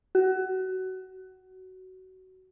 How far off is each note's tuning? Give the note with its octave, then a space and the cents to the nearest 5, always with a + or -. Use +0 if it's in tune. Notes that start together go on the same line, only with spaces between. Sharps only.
F#4 +20